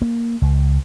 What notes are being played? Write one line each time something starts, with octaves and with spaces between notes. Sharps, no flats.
A#3
C#2